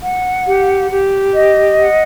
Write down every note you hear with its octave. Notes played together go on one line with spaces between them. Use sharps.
F#5
G4
G4
D#5
F#5